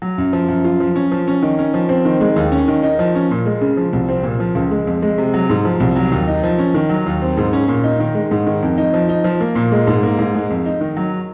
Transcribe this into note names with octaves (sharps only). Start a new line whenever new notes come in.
F#3
F#2
F3
F#2
F4
F3
C#4
F3
C#4
D#3
C#4
F3
C4
D#3
G#3
D#2
C#4
D#3
D#4
F3
C#4
A#2
G#3
C#3
F3
C2
C4
A#2
F3
C#2
G#3
F2
G#3
C3
F#3
G#2
F3
C2
F#3
D#2
D#4
F3
C#4
D#3
F#3
D#2
C4
G#2
C#4
A#2
D#4
D#3
G#3
G#2
D#3
F2
D#4
F3
D#4
F3
A#3
A#2
G#3
G#2
A#3
G#2
G#3
F2
D#4
D#3
F#3